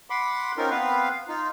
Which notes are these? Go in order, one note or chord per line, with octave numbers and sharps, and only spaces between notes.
F#5 B5 C6 D6
C4 C#4 D#4 F4 A#4
B3 C4 B4 F5
D#4 F4